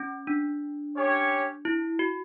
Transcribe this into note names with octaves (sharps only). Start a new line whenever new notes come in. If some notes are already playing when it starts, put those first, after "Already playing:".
Already playing: C#4
D4
C#4 G4 C#5
E4
F#4